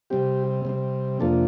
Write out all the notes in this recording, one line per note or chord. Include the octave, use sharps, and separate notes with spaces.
C3 G3 C4 G4
C3 G3 C4
F2 C3 F3 A#3 D4 A4